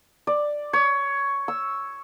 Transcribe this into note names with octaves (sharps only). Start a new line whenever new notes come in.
D5
C#5
E6